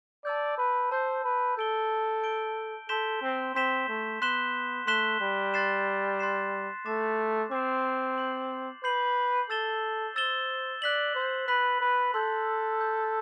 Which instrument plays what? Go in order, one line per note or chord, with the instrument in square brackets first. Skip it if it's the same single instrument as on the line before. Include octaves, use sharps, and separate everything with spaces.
[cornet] D5 [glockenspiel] A5 E6 G6
[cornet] B4
[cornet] C5 [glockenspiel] A5 E6 G6
[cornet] B4
[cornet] A4 [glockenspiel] G6 D7 G7
[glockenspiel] G6 D7 G7
[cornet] A4 [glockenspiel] C6 G6 B6 E7 G7
[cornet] C4
[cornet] C4 [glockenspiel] C6 G6 B6 E7 G7
[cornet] A3
[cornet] B3 [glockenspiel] C6 F#6 B6 E7 G7
[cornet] A3 [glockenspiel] C6 F#6 B6 E7 G7
[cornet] G3
[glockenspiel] C6 F#6 A6 C7 E7
C6 F#6 A6 C7 E7
[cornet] A3 [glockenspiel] D6 A6 C7 E7
[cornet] C4 [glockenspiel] D6 A6 C7 E7
[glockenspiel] G6 C7 F#7
[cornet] B4 [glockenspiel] G6 C7 F#7
[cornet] A4 [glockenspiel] E6 A6 E7 G7
[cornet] C5 [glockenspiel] E6 A6 E7 G7
[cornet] D5 [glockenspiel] F#6 B6 F#7
[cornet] C5
[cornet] B4 [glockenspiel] F#6 B6 F#7
[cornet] B4
[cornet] A4 [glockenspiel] C6 E6 G6
[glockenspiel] C6 E6 G6